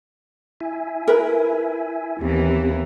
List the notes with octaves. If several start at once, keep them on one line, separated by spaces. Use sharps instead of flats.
E4 E5 G#5
A#4 B4
D#2 E3 B3 C4 G4